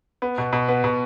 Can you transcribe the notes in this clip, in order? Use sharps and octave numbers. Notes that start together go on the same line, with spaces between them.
B3
B2
B2
B3
B2